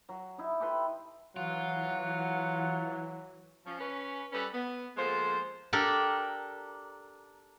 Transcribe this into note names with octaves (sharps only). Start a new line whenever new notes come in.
F#3
D#4 E4
G4 A4 B4 C6
E3 F#3 F4 F#5
F3 C#4
C#4 B4
G3 C#4 A4 B4
B3
F3 G#3 A#3 B3 A4 C5
D4 G4 A4 A#4